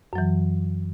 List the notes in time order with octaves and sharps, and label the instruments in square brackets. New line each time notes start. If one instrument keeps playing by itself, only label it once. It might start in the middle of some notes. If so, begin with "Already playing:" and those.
[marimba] F#2
F#3
E3